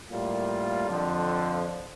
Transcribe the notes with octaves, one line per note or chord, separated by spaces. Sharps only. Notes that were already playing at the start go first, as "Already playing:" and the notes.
A2 G3 A#3 F4
F2 D3 F3